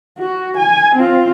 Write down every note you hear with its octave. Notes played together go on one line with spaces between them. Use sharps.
F#4
G#5
C4 F4